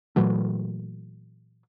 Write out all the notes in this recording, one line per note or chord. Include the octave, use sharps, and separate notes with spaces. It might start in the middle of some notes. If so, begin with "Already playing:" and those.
A#2 E3 F#3 A3